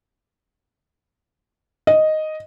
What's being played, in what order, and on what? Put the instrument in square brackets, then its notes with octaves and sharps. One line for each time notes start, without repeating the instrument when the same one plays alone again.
[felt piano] D#5